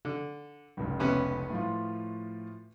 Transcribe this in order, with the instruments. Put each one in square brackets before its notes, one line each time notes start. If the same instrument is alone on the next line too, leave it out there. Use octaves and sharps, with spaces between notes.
[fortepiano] D3
[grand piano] F1 C#2
[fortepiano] C3 B3 C#4
[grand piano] A2 F3 F4